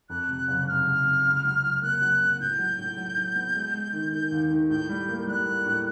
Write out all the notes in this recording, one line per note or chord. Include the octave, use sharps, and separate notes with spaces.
F2 F#6
C3
F#1
C3 F6
F#1
C3
C#2
F#3
F#3
A#3 F#6
F#3
C#2
A2 G6
F#3
A2
F#3
F#3
B3
G#3
G#3
D#3
D#3 G6
D#2
D#3
A2 G6
G3
A#3
G3 F#6
A#3
A2